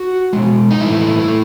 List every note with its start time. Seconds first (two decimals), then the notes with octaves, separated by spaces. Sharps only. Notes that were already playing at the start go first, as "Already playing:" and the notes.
Already playing: F#4
0.33 B2 G#3
0.71 D#4
0.81 G2 E3 A3 E4
1.28 A3